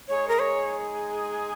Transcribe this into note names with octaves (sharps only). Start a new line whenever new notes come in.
G#3 D#4 G#4 C#5
A#4
C#5